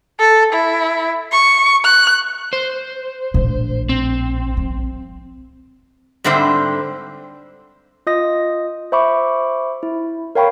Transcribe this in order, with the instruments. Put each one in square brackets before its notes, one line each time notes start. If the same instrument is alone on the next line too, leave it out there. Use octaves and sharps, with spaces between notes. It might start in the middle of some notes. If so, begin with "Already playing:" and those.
[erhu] A4
E4
C#6
F#6
[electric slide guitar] C5
[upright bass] A#1 A2
[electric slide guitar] C4
[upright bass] F3
[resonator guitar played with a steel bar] G#2 D3 G3 C4 C5 E5
[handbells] F4 D#5 D#6 A#6
C5 E5 B5 C#6 D6
E4
A#4 C#5 F5 G5 B5 C#6